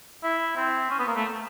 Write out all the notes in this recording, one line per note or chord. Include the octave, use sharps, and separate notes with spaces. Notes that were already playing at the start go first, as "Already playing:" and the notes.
E4
C4
C#4
B3
A#3
A3